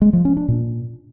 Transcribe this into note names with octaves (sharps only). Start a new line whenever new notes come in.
G#3
F3
C#4
D4
A#2